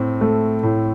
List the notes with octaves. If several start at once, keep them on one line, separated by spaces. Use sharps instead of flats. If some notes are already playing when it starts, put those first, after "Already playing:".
Already playing: A2 C4
A3
A2